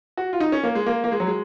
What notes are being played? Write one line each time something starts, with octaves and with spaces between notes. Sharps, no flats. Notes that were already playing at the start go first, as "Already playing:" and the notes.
F#4
F4
D#4
C#4
A#3
G#3
A#3
A#3
G#3
F#3
G#3